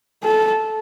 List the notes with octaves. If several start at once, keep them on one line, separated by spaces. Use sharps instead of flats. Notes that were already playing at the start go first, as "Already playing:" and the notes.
A4